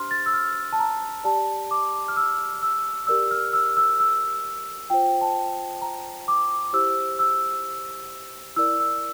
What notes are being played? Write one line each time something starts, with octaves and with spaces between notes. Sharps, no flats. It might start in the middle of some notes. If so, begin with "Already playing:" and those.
Already playing: D4 G4 C5 C6 F6
A6
E6
F6
A5
A#5
G4 D5 A5
D6
F6
E6
E6
G4 A#4 D5 E6
F6
E6
E6
E6
F4 C5 G5
A5
A#5
D6
E4 G4 C5 E6
E6
E4 A#4 D5 E6
E6